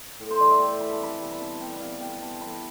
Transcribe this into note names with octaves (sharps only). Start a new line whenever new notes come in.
A2
C5
E3 G3 D5
E5
A2 G5
E3 G3 B5
A5
C3 B5
G3 B3
B5
C3 A5
G3 B3 G5
G5
C3 F5
E3 B3 G5
C3 A5
E3 B3 B5